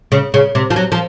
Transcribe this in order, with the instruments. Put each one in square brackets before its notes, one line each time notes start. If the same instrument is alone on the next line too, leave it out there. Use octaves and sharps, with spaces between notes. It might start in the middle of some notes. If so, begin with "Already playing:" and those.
[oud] C#3
C#3
C3
F3
F#3
F3